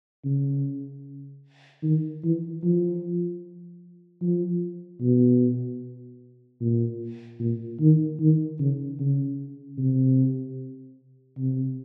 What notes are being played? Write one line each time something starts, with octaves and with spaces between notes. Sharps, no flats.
C#3
D#3
E3
F3
F3
B2
A#2
A#2
D#3
D#3
C#3
C#3
C3
C3